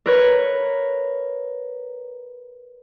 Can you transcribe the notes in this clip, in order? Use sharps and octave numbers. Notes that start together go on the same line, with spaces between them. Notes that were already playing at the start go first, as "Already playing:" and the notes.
A#4 B4 C#5